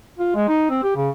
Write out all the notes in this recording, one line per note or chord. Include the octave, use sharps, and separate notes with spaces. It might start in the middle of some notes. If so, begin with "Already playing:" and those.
F4
G#3
D#4
C4
G4
C#3